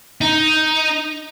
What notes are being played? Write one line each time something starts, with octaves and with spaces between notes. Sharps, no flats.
D#4